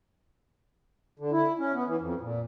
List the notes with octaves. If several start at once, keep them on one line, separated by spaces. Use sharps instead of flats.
D3
E4
C#4
B3
E3
F2
A#2